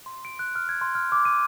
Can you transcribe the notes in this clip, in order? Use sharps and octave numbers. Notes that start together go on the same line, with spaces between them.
C6
D7
F#6
F6
G#6
C6
F6
D6
D#7